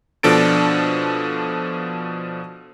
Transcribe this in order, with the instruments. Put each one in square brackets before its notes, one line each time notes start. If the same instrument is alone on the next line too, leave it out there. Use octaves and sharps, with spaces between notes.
[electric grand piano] B2 F3 D4 A4 A6 D7